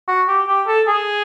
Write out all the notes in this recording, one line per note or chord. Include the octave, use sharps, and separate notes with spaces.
F#4
G4
G4
A4
G#4